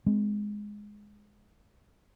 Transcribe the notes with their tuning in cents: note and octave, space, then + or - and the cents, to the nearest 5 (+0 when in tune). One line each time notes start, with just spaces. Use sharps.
G#3 +0 C4 -25